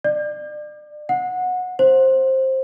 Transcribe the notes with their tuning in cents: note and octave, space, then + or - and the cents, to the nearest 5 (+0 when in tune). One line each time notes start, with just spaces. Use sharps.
D5 +35
F#5 -20
C5 +15